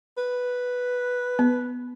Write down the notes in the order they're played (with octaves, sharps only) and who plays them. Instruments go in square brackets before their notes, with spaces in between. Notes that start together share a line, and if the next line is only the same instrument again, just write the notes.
[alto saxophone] B4
[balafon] B3